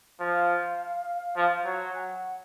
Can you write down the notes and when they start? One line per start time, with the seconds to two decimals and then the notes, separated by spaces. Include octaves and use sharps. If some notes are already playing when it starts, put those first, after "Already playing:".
0.20 F3 F5
1.36 F3
1.65 F#3
1.95 G#5
1.99 F#5